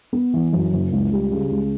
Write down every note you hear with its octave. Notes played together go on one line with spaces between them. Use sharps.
B3
E3
F#2
F#1
C#2
G3
C#3
C#2